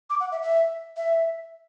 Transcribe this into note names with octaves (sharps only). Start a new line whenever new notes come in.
D6
F#5
E5
E5
E5